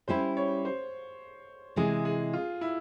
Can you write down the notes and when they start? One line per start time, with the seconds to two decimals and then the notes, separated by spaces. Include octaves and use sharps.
0.08 G3 C#4 E4 G4 C5
0.37 C#5
0.65 C5
1.76 C3 E3 G#3 E4 G#4
2.05 G#4
2.33 F4
2.61 E4